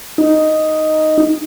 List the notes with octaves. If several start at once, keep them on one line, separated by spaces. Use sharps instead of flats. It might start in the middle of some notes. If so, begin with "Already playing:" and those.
D#4